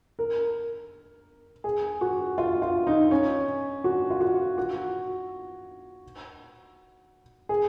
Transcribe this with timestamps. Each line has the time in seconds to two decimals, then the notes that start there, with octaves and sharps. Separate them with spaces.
0.19 A#4
1.64 G#4
2.01 F#4
2.38 F4
2.62 F4
2.87 D#4
3.11 C#4
3.84 F#4
4.10 F4
4.21 F#4
4.58 F#4
7.49 G#4